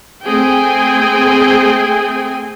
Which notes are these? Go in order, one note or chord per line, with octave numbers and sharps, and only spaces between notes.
A3 C4 G#4 G5 G#5